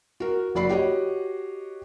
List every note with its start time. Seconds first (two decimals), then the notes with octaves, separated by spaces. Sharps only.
0.20 F#4 A#4
0.55 F#1 F#4 D5 B5 C7
0.69 F#4 G4 C#5 D#5 F#5